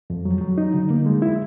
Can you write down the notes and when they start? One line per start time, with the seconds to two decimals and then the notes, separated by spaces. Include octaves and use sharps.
0.10 F2
0.25 F#3
0.41 F#3
0.58 D#4
0.74 D3
0.90 A#3
1.06 G#3
1.22 E4